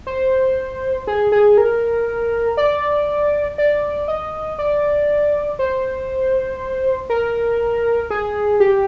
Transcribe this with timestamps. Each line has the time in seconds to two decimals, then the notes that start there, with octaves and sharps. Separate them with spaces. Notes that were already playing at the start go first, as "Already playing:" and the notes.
0.07 C5
1.07 G#4
1.32 G#4
1.58 A#4
2.57 D5
3.58 D5
4.08 D#5
4.59 D5
5.59 C5
7.10 A#4
8.10 G#4
8.60 G4